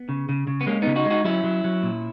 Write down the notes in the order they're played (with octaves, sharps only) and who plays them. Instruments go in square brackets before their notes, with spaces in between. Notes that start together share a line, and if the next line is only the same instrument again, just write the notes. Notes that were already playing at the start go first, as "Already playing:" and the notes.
Already playing: [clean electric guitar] B3
C#3
C#3
C#3
B3
G#3 A#3 C#4
C#3 B3 D#4
D#4 F#4
G#3
D#4 F#4
F#3 C#4 E4
F#3
F#3
A#2